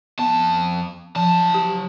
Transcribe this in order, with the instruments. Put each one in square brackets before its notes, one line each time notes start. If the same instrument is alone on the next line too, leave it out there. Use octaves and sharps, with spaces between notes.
[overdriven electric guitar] F2 A5 [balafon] B3
[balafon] F3 [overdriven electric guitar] F#3 A5
[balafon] G4